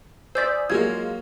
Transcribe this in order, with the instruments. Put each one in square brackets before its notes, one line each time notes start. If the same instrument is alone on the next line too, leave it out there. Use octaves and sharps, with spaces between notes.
[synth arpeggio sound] C5 D5 [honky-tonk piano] G#5 D#6 [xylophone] E6 G6 B6
[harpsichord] F#3 A#3 A#4 [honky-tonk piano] G#3 F4 [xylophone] G#6